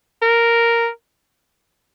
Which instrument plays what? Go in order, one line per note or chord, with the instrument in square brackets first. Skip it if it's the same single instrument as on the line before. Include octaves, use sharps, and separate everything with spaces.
[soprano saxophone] A#4